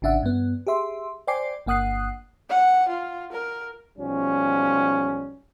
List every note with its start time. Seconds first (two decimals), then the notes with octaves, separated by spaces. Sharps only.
0.02 G#1 C#3 D4 E5 F#5
0.23 G2 B3
0.67 G4 G#4 E5 C6
1.27 C5 D5 G5 G#5 D6 C7
1.66 G1 A#3 F#5 D#6 F#6 C7
2.49 F#5
2.88 F4
3.32 A#4
3.98 B1 F3 G3 C#4